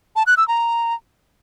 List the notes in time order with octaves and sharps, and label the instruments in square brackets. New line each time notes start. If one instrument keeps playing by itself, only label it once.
[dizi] A5
F#6
E6
A#5